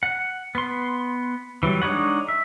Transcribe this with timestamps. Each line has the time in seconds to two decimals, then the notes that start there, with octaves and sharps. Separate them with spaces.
0.03 F#5
0.55 B3 C6
1.63 E3 F#3 G3
1.82 G#3 D4 D#4 C#5 F#5
2.28 E5